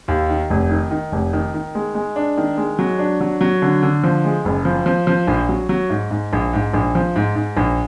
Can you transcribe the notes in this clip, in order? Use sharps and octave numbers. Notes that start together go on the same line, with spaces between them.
D#2
D#3
F1
D#3
D#3
F1
D#3
D#3
G#3
G#3
D4
D#3
G#3
F#3
D4
F#3
F#3
D3
D3
F3
G#3
F#1
F3
F3
F3
A#1
F#3
F#3
G#2
G#2
A#1
G#2
A#1
F3
G#2
G#2
A#1